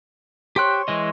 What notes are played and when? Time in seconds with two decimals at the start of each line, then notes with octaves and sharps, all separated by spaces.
0.56 G4 C5 C#5 G5 F#6
0.88 E3 G#3 D#5